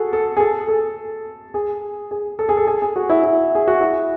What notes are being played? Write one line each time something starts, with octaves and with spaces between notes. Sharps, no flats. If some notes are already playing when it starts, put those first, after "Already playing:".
Already playing: F#4 G#4 A4
A4
G#4
A4
A4
G#4
G#4
A4
G#4
A4
G#4
G#4
F#4
E4
E4
G#4
F#4
E4